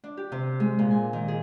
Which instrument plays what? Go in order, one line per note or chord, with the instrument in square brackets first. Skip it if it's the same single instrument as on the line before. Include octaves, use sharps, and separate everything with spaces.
[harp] D4
G4
C3
G#3
A#2
G#5
D#3
G#4